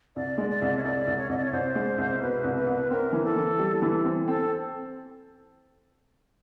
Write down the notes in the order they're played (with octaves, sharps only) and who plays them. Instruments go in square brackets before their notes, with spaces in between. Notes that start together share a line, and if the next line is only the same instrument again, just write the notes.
[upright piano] C2 [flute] D5
[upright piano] G#3
[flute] D5
[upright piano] C2
[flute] C#5
[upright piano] C2 [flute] D5
[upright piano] C2
[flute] C#5
[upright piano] C2 [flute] D#5
[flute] D5
C#5
[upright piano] C2 [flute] C5
[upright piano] G#3
C2
[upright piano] B2 [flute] B4
[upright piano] C2
[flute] B4
[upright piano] C2
[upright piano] C4 [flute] A#4
[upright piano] E3
[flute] A4
[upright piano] E3
G3
E3
C4
[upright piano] C4 [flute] A4